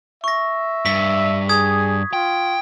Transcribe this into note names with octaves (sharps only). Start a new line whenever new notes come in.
E5 C#6 A#6
G2 B6
G#4 D#6 G#6
F4 G5